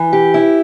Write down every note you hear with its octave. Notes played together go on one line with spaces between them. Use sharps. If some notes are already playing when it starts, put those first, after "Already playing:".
Already playing: E3
G4
E4